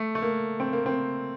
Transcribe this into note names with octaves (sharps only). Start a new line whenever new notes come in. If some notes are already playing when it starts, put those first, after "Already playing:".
Already playing: A3
A3
A#3
C4
A#3
C4